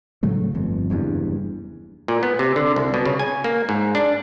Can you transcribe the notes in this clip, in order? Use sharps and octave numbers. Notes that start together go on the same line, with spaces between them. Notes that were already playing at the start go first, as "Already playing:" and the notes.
A2 C#3 F#3 A3
G1 F2
F#1 E2 G2
A#2
B3
C3
D3
C2
B2
C#3
G#5
A#3
G#2
D4